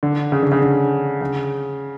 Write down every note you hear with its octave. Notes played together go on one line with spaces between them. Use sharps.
D3
C#3
D3
C#3
D3
C#3